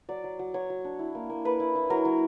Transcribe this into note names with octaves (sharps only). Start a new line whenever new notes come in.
F#3 D5
F#3
F#3
F#3 C#5
F#3
D4
E4
A#3
A#3
A#3 B4
E4
E4
F#3 A#4
F#3